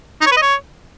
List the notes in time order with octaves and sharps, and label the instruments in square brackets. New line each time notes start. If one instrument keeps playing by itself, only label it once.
[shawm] D#4
C#5
B4
D#5
C#5